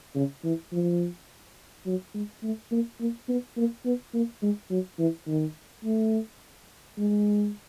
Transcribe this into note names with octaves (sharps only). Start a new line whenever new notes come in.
C#3
E3
F3
F#3
G#3
A3
A#3
A#3
B3
A#3
B3
A#3
G#3
F#3
E3
D#3
A3
G#3